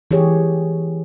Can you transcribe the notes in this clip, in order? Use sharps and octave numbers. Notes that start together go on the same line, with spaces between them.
E3 G4 G#4 C#5